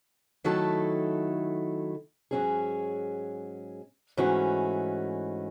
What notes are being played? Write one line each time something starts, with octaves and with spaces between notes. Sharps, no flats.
D#3 F#3 A3 E4 A4
G#2 F#3 C#4 G#4
G#2 E3 A3 C#4 F#4